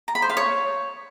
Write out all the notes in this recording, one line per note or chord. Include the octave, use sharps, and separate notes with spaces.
A#5
B5
C5
F5
C#5